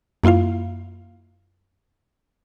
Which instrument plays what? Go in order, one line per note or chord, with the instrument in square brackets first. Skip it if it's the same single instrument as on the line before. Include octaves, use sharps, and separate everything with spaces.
[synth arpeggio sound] F#2 A#3 E4 F4 F5